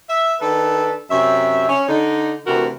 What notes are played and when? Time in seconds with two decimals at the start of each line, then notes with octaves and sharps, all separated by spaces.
0.09 E5
0.41 D#3 D4 A4 B4
1.11 F#2 C3 C#5 E5
1.69 C#4
1.88 D3 D#4
2.46 D2 C3 E3 F#4 A#4